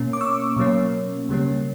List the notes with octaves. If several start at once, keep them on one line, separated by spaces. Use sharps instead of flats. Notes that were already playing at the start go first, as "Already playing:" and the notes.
Already playing: B2 A#3 C#4
D6
C#6 E6
B2 F#3 A#3 C#4
C#3 G3 A#3 C#4